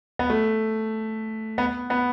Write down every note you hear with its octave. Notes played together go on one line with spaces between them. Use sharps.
B3
A3
B3
B3